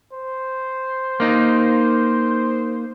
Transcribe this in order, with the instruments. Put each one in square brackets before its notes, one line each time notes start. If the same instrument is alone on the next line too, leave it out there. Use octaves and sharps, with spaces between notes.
[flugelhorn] C5
[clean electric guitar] A#3 D#4